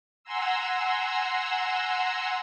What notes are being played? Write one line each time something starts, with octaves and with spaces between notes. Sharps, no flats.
F#5 G#5 A#5 C6 E6